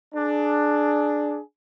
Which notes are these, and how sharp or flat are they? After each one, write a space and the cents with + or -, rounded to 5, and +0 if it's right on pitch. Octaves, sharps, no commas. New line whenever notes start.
D4 +10 G#4 +25